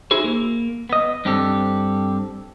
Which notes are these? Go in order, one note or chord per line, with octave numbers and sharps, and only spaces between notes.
D#4 E4 F#4 G#4 C5
A#3
B3 D#5
G2 C4 D4 G4 A4